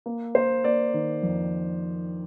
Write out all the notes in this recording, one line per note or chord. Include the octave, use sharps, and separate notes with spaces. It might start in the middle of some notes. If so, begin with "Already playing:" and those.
A#3
A#3 C5
A#3 D5
D#3
F2